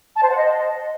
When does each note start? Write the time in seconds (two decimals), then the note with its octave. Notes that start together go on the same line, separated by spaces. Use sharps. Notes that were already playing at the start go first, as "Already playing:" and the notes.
0.15 A5
0.22 C5
0.29 F#5
0.36 D#5